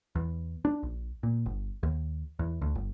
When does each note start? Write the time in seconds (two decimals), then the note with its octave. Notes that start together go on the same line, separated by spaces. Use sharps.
0.15 E2
0.65 D4
0.83 A#1
1.23 A#2
1.46 G1
1.83 D#2
2.39 E2
2.61 D2
2.75 G1